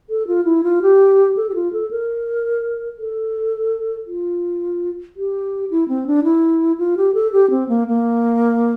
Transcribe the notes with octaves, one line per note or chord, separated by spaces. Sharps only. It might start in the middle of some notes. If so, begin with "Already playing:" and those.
A4
F4
E4
F4
G4
A4
G4
F4
A4
A#4
A4
F4
G4
E4
C4
D4
E4
F4
G4
A4
G4
C4
A#3
A#3